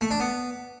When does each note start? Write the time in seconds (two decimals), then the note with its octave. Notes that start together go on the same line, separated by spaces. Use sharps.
0.01 A3
0.11 D4
0.20 B3